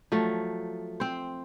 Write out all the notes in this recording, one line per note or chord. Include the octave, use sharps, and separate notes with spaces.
F3 F#3 A3
C4 C5